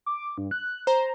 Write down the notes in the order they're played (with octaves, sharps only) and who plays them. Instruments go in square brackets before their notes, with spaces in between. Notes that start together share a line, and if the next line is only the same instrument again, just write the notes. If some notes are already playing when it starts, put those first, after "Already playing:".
[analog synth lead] D6
G2
F#6
[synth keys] C5 [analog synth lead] A#5